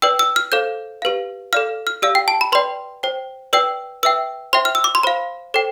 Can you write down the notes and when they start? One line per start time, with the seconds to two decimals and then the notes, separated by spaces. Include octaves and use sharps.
0.02 B4 D5 G5 E6
0.19 E6
0.36 F6
0.52 A4 C5 F5 G6
1.02 G4 B4 F5
1.53 A4 D5 F5 F6
1.87 F6
2.02 G4 D5 F5 E6
2.15 G5
2.28 A5
2.41 B5
2.52 B4 D5 G5 C6
3.03 C5 G5
3.53 B4 D5 G5 E6
4.03 B4 E5 G5 E6
4.53 C5 E5 G5 C6
4.65 F6
4.75 E6
4.84 D6
4.95 C6
5.03 C5 F5 B5
5.54 A4 C5 G5